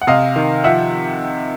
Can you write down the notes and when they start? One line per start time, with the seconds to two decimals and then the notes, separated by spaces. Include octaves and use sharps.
0.02 F#5
0.07 C3 D#5 F5
0.36 D#3
0.64 F3 E5 F#5